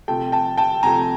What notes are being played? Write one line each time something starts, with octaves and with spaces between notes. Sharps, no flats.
C3 F3 A3 G5 A5
G5 A5
G5 A5
C3 F3 A3 G#5 A#5